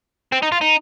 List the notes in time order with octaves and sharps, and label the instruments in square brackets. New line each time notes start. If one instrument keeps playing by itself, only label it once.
[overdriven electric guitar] C4
D#4
F4
D#4